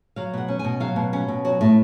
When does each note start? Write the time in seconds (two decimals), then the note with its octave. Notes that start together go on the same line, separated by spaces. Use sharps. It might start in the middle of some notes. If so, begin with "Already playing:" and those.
0.16 F#3 F5
0.33 B2 F#5
0.48 C#4
0.59 G#5
0.64 B2
0.80 F#3 F5
0.96 B2
1.13 C#4
1.28 B2
1.45 F#3
1.61 A2